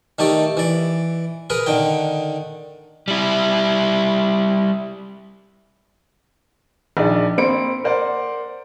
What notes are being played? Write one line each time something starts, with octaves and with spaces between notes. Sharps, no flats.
D#3 A3 D#4 G4 D5
E3 D5
G#4 A#4 B4
D3 D#3 G5
G3 E4
A#1 D4 D#4 G#4 D5
A#3 C4 C5 B5 C#7 D7
A#4 C5 D5 F#5